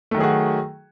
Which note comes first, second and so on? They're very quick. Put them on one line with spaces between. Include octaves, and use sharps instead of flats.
A3 D#3 F#3 G#4 F#4